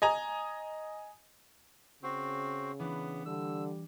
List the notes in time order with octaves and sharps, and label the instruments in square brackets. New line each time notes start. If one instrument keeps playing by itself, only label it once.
[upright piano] D#5 G#5 A#5
[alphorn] C#3 [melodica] C4 F#4
[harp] E3 D4 [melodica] B3
[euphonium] D3 [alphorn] G3 [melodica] E6